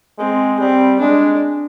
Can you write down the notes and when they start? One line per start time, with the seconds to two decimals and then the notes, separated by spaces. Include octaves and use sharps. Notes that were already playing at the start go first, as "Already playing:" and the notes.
0.19 G#3 C4
0.60 G3 C4
1.00 G#3 D4